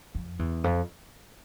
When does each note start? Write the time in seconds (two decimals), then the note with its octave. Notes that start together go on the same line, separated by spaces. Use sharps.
0.15 F2
0.39 E2
0.64 F2